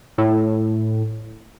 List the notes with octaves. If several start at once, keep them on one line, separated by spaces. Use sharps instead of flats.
A2